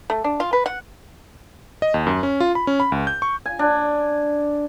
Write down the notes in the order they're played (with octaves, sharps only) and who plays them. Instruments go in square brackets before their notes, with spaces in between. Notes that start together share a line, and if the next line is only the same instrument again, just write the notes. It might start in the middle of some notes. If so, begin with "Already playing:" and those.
[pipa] A3
D4
F4
B4
F#5
[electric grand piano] D#5
D#2
F#2
C#4
F4
B5
C#4
B5
C#2
G6
C#6
[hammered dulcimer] G#5
D4